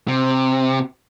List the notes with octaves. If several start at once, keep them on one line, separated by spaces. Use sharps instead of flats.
C3